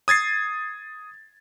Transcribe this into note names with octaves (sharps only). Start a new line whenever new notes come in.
D#6 G#6 A6 C7